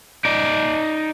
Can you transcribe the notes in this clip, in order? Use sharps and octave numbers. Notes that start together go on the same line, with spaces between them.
D#4 D5